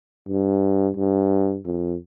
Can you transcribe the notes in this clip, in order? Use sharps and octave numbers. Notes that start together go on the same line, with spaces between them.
G2
G2
F2